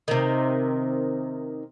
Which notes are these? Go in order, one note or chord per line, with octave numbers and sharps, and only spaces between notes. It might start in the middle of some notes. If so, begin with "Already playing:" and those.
C3 D#3